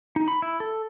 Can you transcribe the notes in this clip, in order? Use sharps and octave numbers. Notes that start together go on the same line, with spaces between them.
D#4
B5
E4
A4